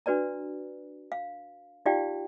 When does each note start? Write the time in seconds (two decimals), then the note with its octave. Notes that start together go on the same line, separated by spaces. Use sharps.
0.06 D4 F#4 B4 D5 A#5
1.12 F5
1.86 D#4 F4 G4 D5 F5 G5